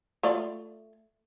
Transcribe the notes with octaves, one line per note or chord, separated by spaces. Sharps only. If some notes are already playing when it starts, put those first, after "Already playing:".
A3 F4 D5